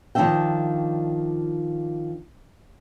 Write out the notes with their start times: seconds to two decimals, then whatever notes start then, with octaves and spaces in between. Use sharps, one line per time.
0.15 D#3 F3 C4 D4 E5 G5